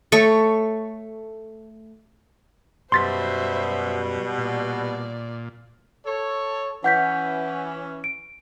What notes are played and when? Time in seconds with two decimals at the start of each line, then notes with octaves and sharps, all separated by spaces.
0.12 A3 A4 C#5 C#6
2.92 F#2 B2 G3 C5 E5 C6 A6 B6
4.38 A#2 D5
6.06 A4 C#5
6.84 E3 C#4 F#5 G6 B6
8.04 D7